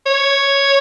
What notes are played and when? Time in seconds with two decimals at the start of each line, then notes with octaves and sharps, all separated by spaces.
0.06 C#5